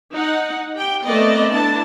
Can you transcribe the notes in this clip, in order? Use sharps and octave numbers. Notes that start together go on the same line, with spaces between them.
D#4 F#5
G4 G5
A3 B3 C4 A#4 D5 D#5
B3 D4 E4 A5